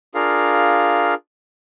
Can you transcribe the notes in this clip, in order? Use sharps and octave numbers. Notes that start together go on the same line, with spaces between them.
D4 F4 G#4 A#4 F5